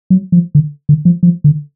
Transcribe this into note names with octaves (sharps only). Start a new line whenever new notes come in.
F#3
F3
D3
D3
F3
F3
D3